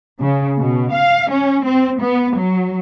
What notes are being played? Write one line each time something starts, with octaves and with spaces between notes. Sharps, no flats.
C#3
B2
F5
C#4
C4
B3
F#3